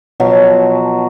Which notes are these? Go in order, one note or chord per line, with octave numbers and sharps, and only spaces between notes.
B2 F3 F#3 F5